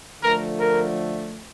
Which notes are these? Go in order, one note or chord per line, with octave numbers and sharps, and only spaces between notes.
D3 F3 A3 A#4
A#4